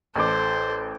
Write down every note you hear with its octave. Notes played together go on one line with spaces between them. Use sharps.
A1 A4 C5 D6